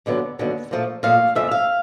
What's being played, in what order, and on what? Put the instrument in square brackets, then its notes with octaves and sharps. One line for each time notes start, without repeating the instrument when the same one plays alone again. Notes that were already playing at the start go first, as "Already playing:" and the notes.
[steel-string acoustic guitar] D#2 D3 F#3 B3
D#2 D3 F#3 B3
A#2 F3 A3
A#2 F3 A3 F5
F2 C#3 F3 A3 E5
F5